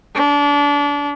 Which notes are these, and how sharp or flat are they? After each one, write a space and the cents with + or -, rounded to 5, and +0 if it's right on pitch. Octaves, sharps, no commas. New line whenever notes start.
D4 -30